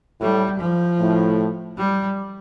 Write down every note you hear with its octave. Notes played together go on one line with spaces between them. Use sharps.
A2 G3
F3
A2
G3